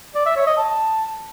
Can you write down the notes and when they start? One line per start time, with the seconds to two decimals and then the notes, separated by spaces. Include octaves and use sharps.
0.15 D5
0.26 E5
0.36 C#5
0.47 D#5
0.57 A5